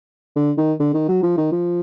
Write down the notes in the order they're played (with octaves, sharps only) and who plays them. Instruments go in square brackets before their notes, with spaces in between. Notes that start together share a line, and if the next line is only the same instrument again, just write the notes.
[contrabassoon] D3
D#3
D3
D#3
F#3
F3
D#3
F3